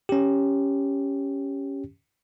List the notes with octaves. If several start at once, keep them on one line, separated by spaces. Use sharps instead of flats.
C#4 G4